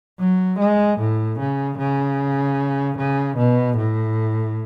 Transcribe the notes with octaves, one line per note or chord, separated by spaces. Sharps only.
F#3
G#3
A2
C#3
C#3
C#3
B2
A2